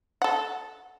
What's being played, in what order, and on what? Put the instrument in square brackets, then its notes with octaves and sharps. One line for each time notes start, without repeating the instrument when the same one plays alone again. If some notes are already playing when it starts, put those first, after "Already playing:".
[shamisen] A4 F#5